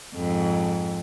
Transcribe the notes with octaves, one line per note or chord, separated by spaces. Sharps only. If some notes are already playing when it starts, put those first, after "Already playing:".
F2 G#2